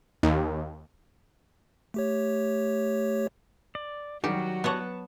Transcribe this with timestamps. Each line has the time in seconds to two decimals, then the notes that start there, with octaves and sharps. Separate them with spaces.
0.23 D#2
1.94 A3 G4 C#5
3.75 D5
4.24 D#3 F#3 G3 F#4 G4
4.64 B3 B4 C#5 F#5 A5 C#6